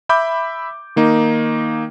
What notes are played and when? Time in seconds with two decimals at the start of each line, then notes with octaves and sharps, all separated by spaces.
0.09 E5 B5 D6 G6
0.96 D#3 A#3 D#4